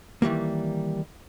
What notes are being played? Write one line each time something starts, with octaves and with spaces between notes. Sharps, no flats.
D#3 E3 G3 A#3